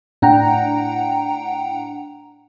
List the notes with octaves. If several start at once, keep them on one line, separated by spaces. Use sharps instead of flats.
A2 D4 F#5 G5 A#5